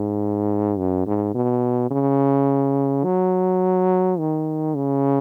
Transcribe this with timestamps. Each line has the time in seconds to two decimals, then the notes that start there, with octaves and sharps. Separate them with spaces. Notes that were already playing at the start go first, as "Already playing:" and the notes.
Already playing: G#2
0.79 F#2
1.07 G#2
1.35 B2
1.91 C#3
3.04 F#3
4.19 D#3
4.75 C#3